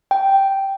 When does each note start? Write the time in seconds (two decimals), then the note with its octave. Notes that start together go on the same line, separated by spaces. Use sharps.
0.11 G5